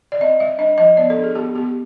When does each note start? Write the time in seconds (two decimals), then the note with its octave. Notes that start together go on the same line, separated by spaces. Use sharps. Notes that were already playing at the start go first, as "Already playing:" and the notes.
0.12 D5
0.21 C4 D#5
0.40 G3 E5
0.59 D4 D#5
0.78 F3 D#5
0.97 B3 D5
1.10 A4
1.17 D4
1.24 G#4
1.35 B3 G4
1.55 B3 G4